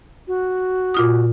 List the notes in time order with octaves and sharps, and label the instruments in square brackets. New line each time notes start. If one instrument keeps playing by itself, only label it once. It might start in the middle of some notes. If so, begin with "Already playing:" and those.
[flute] F#4
[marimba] A#2 F4 D#6